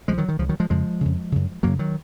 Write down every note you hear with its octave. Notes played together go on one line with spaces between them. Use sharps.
C#2 C#3 F3 G#3
D#3 F#3
D#3
C#2 C#3 F3
D#3 F#3
F3 G#3
F2 C#3 F3 G#3
F2 C#3
F#2 C#3
F#2 C#3 F#3 A#3
D#3 F#3